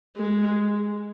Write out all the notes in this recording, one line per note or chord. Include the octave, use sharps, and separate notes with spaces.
G#3